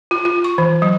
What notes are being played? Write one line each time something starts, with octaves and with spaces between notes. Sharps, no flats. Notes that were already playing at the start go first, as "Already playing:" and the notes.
F4
F4
C#6
E3
F#3